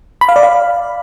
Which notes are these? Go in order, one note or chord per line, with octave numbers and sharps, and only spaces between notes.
B5
F5
D5
F5